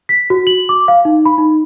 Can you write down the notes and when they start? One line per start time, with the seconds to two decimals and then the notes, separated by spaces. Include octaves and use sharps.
0.09 B6
0.30 F#4
0.47 F#7
0.69 D6
0.88 F5
1.05 D#4
1.25 B5
1.38 D#4